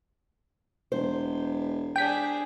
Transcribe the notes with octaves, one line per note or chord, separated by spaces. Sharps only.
E1 C5
D4 G#4 G5 B6